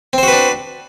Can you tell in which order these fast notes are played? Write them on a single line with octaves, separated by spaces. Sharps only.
C4 C5 F#4 B4 D4